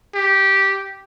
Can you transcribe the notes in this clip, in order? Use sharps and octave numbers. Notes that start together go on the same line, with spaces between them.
G4